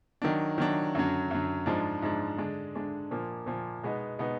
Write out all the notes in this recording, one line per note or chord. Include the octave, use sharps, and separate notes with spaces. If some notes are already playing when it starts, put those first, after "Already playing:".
D#3 F#3 D4
D#3 F#3 D4
F#2 D3 F#3
F#2 D3 F#3
G#2 F3 G#3 D4
G#2 F3 G#3 D4
D3 G#3 D4
D3 G#3 D4
A#2 F3 A#3
A#2 F3 A#3
B2 G#3 B3 D#4
B2 G#3 B3 D#4